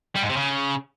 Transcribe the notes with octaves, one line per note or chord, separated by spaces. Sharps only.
G3
G#2
C3
C#3